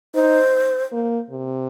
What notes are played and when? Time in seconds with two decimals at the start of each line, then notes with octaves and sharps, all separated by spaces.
0.15 D#4 C5
0.92 A#3
1.30 C3